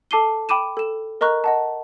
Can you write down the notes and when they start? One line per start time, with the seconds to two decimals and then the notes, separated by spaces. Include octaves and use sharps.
0.11 A4 A5 D6 C7 D#7 G7
0.49 G5 B5 D6 D#7 E7
0.77 A4 E7
1.21 A#4 D#5 A#5 C#6 F#6
1.44 D#5 F#5 A5